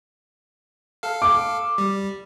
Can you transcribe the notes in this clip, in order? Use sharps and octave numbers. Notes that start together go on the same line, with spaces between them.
A4 F5
D6
G3